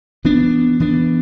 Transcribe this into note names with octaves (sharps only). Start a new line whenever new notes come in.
E3 B3 D4
E3 B3 D4